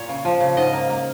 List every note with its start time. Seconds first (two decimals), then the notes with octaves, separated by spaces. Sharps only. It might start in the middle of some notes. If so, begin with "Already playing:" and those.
Already playing: A#2 C#5
0.09 C#3
0.25 F3
0.41 C#3
0.57 G#2 D#5
0.73 A#3
0.90 A#3